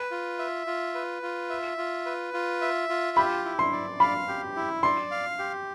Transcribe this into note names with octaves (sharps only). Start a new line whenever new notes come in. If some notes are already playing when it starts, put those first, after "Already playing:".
Already playing: B4
F4
E5
F4
B4
F4
E5
F4
B4
F4
E5
F4
G4 B5
E4
C6
D5
F5 B5
G4
E4
D5 C6
F5
G4